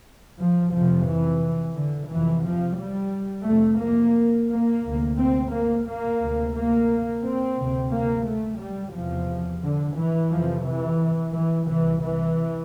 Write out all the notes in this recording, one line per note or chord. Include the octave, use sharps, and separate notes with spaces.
F3
F2 C3 F3
E3
D3
F2 C3 E3
F3
G3
F2 C3 A3
A#3
A#3
D2 C3
C4
A#3
A#3
D2 C3
A#3
C4
D2 C3
A#3
A3
G3
E2 C3 F3
D3
E3
F2 C3 F3
E3
E3
C2 C3 E3
E3